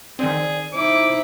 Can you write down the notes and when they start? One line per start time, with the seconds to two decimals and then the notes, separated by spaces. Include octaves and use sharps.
0.19 D#3 C4 G#4 D5
0.73 D#4 E4 C5 D6